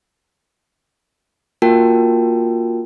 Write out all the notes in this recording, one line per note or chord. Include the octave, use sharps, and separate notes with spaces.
A#3 F4 F#4 A#4 G5 A5